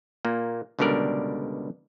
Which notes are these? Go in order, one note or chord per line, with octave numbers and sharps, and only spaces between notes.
A#2 A#3
C#2 B2 D3 G3 A#4 D5